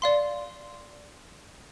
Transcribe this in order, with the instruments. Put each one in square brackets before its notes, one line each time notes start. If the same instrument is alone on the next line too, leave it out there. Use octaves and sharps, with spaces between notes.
[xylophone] D5 F5 C6